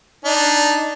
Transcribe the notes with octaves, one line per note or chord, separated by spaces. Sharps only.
D4 D#4